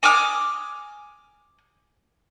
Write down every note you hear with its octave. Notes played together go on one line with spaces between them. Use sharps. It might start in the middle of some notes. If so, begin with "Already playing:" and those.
G#5 D6 D#6 F6